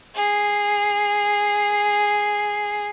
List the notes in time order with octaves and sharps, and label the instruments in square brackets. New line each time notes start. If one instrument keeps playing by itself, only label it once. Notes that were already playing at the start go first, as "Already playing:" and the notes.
[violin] G#4 C7